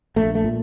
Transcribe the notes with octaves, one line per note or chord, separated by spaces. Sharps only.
A#1 A3
A3
A#2